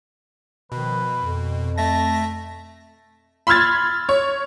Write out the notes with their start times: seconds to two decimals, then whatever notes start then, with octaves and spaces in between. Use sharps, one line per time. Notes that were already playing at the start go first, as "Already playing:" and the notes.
0.72 B2 D#3 F3 B4
1.20 F2
1.78 A3 E5 A5 A#6
3.47 B5 C6 E6 F6 G#6 A6
4.09 C#5